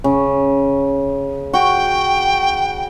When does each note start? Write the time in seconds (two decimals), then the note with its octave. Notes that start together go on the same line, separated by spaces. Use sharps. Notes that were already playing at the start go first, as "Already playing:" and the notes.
0.04 C#3
1.54 F#4 G5